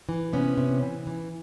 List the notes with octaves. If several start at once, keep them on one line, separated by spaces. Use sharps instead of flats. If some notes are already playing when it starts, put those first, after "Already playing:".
E3
C3 B3 C#4
C3
E3
E3